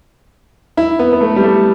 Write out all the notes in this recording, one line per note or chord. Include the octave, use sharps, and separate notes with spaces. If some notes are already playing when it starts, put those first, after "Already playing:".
E4
B3
B3
A3
G3
A3